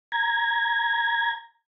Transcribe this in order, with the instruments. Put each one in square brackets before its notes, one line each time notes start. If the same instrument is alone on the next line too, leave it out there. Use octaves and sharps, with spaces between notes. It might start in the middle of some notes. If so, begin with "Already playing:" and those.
[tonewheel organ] A#5 G#6